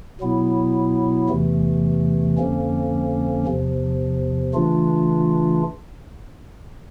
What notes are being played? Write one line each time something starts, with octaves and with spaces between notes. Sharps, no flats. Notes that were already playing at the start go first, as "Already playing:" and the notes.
B2 F#3 B3 E4
E2 C3 E3 A3
F2 D3 F3 A#3 C#4
E2 C3 F3
C#3 E3 A3 D4 F4